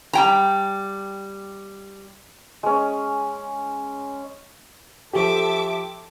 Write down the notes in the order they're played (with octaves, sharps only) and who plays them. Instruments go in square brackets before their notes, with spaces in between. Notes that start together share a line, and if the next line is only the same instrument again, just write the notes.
[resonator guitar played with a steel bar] G3 G5 A#5
[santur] G#3 C#4
[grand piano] F3 G4 [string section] A4 E5 D6